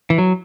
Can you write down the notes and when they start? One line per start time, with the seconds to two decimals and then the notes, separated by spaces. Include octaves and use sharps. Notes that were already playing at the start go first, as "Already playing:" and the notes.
0.10 E3
0.18 F#3